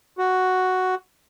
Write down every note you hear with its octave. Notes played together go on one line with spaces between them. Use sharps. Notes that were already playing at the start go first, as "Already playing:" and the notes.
F#4